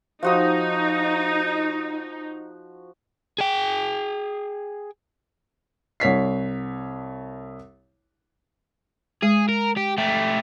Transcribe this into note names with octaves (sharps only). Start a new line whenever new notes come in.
F3 D#4 F#4 D#6
G#4 G5
C2 C#5 B6 C7
G#3 G#4
A#4
G4
A3 G4